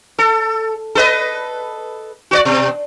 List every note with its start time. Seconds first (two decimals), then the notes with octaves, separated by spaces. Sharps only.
0.19 A4
0.95 A4 B4 D#5
2.31 F#4 C5 D5
2.45 B2